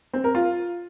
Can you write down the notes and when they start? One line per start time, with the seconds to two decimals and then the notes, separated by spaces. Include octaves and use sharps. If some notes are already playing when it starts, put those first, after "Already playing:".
0.13 C4
0.24 A#4
0.35 F4